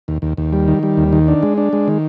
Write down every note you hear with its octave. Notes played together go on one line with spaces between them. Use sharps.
D#2
D#2
D#2
G3
D#3
G3
D#2
D#3
D4
G#3
D4
G#3
D#3